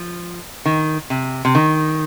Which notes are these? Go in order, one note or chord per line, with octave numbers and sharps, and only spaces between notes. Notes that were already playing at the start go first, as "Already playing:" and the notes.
Already playing: F3
D#3
C3
C3
D#3